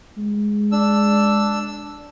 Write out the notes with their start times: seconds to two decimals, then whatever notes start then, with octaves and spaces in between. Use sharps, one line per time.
0.17 G#3
0.72 D4 E6